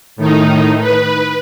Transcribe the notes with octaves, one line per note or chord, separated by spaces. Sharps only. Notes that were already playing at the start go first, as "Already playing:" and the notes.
A2 D#3 D#4
B4